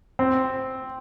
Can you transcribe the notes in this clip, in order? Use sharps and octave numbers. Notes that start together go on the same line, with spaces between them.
C4